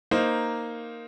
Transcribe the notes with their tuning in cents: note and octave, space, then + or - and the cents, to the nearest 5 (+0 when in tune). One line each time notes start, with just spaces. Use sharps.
A#3 +0 D#4 +0 C5 +0